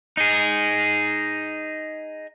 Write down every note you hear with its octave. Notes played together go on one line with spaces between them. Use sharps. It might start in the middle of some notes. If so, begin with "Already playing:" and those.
D#4 G#4